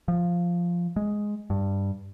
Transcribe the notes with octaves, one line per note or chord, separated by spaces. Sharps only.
F3
G#3
G2